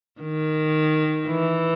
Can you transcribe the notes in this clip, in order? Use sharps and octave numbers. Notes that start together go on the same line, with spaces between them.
D#3
E3